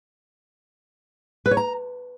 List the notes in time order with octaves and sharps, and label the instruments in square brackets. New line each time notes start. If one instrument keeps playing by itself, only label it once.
[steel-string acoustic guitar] B4
C#5
A#5